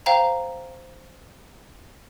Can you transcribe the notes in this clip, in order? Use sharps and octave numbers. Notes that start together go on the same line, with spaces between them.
C5 F5 G5 A#5